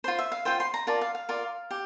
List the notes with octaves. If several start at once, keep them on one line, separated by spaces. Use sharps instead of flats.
F4 C5 C6
E5
F5
F4 C5 G5
C6
A#5
F4 A#4 D5 A5
F5
F5
F4 A#4 D5
G4